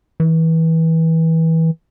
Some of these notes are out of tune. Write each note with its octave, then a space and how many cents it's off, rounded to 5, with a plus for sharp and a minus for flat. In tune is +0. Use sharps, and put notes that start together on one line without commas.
E3 -25